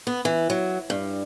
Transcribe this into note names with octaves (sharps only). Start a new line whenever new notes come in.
B3
E3
F#3
G2